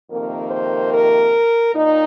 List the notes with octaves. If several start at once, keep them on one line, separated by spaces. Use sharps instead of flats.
F2 C3 D#3 A#3 A#4
C5
A#4
A#2 D#4